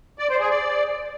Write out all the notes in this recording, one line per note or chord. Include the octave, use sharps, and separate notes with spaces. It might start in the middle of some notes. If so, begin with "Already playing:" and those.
D5
C5
G#4
D5